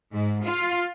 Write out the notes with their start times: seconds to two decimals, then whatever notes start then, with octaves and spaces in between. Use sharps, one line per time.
0.13 G#2
0.45 F4